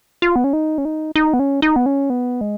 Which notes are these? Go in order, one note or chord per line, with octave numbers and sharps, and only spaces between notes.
F4
B3
C#4
D#4
C#4
D#4
D#4
B3
C#4
D#4
B3
C#4
B3
G#3